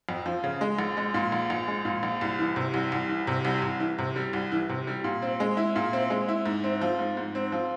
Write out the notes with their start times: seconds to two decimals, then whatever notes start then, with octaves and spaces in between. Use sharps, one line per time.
0.09 F2
0.26 F3
0.44 C#3
0.61 G#3
0.79 A#1
0.97 G#3
1.14 A#2
1.32 A#1
1.50 A#1
1.68 G#3
1.85 A#2
2.03 A#1
2.21 C2
2.39 E3
2.56 C3
2.74 C2
2.92 C2
3.09 E3
3.27 C3
3.45 C2
3.62 C2
3.80 E3
3.99 C3
4.16 G3
4.33 C2
4.52 E3
4.69 C3
4.87 G3
5.04 A#2
5.22 C4
5.40 G#3
5.57 E4
5.76 A#2
5.93 C4
6.10 G#3
6.28 E4
6.46 G#2
6.64 C4
6.82 F3
6.99 G#2
7.17 G#2
7.35 C4
7.52 F3